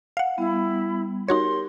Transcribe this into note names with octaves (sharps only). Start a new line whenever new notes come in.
F5 F#5
G3 B3 E4
D#4 F#4 G4 A#4 C#5 C6